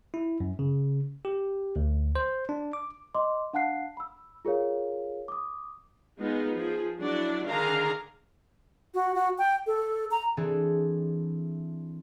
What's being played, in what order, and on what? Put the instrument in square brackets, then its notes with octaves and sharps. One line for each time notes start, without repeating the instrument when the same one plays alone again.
[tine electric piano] E4
F#2
C#3
G4
D2
C5
D4
D6
[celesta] D#5 C6 D6
D4 F5 F#5 A5 F#6 C7
B5 E6
F4 G#4 A#4 C#5 F5
D6 D#6
[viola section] G#3 B3 D#4 F4 G#4
F3 G#4
F#3 D4 E4 F#4 D5
D3 D#3 D4 G#4 F5 A#5
[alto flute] F#4
F#4
G5
A4
A#5
[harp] E3 C4 D4 G#4 A4